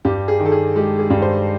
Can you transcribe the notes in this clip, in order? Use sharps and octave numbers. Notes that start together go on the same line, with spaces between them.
G2 G4
G#4
D#3
A4
G#4
G#3 G4
G#4
G2
C5